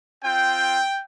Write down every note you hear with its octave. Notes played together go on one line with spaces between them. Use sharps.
C4 F4 G5